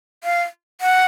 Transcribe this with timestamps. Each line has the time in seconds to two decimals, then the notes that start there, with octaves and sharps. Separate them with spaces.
0.24 F5
0.81 F#5